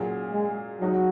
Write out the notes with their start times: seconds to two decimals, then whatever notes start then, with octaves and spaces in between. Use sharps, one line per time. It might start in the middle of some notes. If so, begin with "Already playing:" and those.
Already playing: A#2 F#3 C#4 F4 G#4
0.33 G#3
0.81 F#3 G#3 D#4 F#4